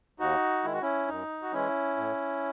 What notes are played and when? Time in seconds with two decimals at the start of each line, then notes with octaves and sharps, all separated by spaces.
0.19 D#2 D#4 F#4
0.64 D#3 G#3 E4
0.73 F#4
0.82 C#4 E4
1.08 F#2 D#4
1.42 F#4
1.52 E3 G#3 C#4 E4
1.97 A2